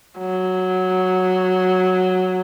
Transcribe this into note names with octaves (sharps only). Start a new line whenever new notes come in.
F#3